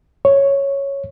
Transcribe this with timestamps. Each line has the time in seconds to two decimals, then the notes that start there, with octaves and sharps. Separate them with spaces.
0.25 C#5